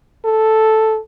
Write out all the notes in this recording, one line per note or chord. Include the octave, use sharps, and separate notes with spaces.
A4